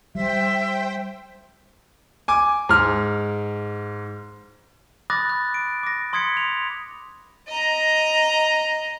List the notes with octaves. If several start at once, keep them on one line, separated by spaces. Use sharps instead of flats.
G3 C5 E5 G5
G#5 D6
G#2 F6
B5 D6 D#6 F#6 A6 A#6
F#6
D7
D6 A#6
C6 D#6 G#6 B6 C#7
F7
D#5 A#5